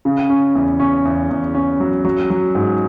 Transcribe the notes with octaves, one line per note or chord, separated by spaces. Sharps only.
C#3
C#4
E2
C#4
E2
E2
C#4
F#3
F#3
F#3
G#2